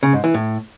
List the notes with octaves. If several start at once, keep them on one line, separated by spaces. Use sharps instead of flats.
C#3
G#2
E3
A2